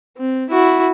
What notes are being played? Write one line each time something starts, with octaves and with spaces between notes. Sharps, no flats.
C4
E4 F#4